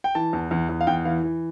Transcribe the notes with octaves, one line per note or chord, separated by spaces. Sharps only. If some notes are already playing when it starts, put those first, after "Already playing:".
G5
E3 A5
E2
E2
E2
F5
E2 G5
E3 F5
E3